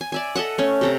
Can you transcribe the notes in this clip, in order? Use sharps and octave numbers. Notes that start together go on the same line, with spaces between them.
G#5
D5 E5 G#5
A4 D#5 E5 F#5
A3 C#4
C3 A4 A#5